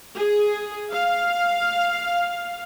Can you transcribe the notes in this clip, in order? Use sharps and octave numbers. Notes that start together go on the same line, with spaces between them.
G#4
F5